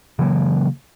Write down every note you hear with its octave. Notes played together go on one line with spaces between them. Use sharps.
C#3 E3 F#3 A#3